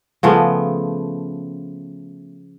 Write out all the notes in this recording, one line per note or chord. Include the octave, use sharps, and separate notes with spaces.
C#3 F3 A3 B3